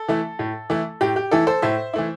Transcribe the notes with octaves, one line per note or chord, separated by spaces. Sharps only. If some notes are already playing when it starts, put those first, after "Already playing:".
Already playing: A4
E3 A3 E4
A2
E3 A3 E4
A2 G4
G4
E3 A3 E4 A4
A4 C5
A2 C5 E5
E3 A3 E4